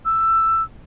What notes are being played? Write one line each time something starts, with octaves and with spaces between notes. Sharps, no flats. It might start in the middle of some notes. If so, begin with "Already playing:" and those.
E6